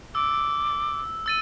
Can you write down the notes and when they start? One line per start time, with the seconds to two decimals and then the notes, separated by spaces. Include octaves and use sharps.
0.15 D6 E6
1.26 E6 A6 D#7